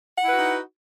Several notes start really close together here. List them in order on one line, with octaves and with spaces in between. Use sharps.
F#5 E4 B4 F#4 D#4